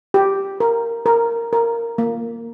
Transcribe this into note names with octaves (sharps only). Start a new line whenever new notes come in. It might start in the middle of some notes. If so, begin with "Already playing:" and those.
G4
A#4
A#4
A#4
A#3